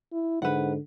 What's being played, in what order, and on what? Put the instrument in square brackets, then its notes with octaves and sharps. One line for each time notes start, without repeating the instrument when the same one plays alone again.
[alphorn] E4
[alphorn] G#2 [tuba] D3 [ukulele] B4 F#5